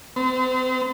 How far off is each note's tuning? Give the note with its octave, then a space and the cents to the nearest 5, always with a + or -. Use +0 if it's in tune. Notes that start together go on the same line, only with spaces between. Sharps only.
C4 -40